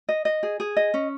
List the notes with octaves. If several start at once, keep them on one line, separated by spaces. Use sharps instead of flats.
D#5
D#5
G#4
G#4
D#5
C#4